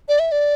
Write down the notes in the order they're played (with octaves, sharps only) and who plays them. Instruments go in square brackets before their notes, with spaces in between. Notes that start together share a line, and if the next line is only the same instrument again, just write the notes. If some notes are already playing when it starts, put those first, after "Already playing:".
[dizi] D5
E5
D5